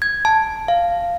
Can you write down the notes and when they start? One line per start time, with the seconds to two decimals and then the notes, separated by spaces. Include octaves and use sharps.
0.02 G#6
0.25 A5
0.68 F5